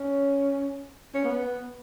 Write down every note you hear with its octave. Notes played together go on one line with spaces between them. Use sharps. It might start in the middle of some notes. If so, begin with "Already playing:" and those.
Already playing: C#4
C#4
B3